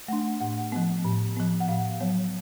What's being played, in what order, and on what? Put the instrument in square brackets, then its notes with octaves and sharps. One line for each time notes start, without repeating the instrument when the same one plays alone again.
[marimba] A3 D4 F#5
A2 F#5
F3 B3
A2
F3 B3
F#5
A2 F5
F#3 B3 C#5